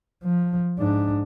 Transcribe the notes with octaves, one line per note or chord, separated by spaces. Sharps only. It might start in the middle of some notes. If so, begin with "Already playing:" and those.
F3
G#2 D4